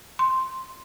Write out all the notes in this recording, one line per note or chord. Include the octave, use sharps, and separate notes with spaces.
C6